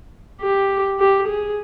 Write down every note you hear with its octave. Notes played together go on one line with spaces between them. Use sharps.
G4
G4
G#4